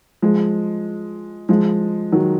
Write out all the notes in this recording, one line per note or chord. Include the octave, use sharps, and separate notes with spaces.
F3 G#3
F3 G#3
D#3 F#3